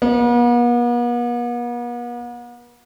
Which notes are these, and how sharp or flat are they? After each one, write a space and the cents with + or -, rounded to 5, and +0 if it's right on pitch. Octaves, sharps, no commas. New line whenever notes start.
B3 -45